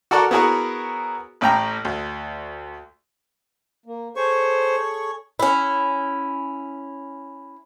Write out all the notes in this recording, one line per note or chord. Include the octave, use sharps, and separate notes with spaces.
F#4 A4 A#4 D5 F#5 C#6
B3 E4 F#4 G#4 A#4 C#5
A1 A2 G5 A#5
D2
A#3
G#4 A4 C5 C#5 C#6
C#4 E4